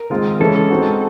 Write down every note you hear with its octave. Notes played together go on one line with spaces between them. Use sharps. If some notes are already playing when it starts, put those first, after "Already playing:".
Already playing: A#4
D#3 G#3 C4 F4
E3 G#3 C#4 A4
A4
G#3 C4 D#4 F#4